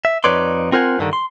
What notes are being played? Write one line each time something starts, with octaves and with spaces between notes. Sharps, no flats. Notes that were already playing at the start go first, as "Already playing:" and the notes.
E5
F2 D#4 B4 C#5 D5 C6
C4 F4 A#4 C5 F#5 G#5
G2 D3 D#3
C6